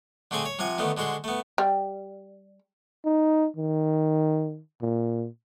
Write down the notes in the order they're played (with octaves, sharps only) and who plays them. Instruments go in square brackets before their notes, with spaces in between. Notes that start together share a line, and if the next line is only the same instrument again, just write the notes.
[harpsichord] D3 A3 C4 G#4 G#5
C#5
C3 F3 F#5 G#5
D3 D#3 A3 B3
D3 G#3 F#4 C5
A3 B3
[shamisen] G3
[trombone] D#4
D#3
A#2